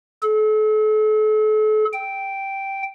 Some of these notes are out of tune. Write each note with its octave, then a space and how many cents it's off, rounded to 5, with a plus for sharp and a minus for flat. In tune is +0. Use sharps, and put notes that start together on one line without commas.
A4 -40
G5 -5